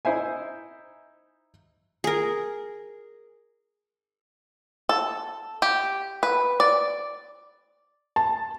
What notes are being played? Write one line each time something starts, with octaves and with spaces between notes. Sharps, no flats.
D#4 E4 C5 E5 G#5
G#4 A#4
A4
G4
B4
D5
A5